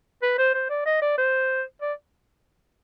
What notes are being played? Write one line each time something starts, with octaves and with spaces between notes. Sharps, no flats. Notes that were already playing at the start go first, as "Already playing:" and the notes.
B4
C5
C5
D5
D#5
D5
C5
D5